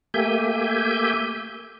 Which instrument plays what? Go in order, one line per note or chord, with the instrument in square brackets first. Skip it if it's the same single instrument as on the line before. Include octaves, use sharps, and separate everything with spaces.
[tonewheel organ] A3 A#3 G4 E5 G#5 G6